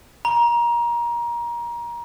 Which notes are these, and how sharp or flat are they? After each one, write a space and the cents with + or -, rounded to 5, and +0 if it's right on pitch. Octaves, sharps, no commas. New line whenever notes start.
A#5 +25